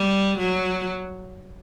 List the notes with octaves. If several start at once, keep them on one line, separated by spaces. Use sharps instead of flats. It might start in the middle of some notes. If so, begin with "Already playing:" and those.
Already playing: G3
F#3